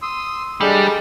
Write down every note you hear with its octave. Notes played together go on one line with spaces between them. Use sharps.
C6 D#6 E6
G3 G#3 D4 G4 A4